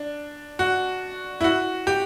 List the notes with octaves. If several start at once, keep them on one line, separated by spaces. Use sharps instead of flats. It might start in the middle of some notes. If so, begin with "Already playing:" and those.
Already playing: D4
F#4
E4
F#4
G4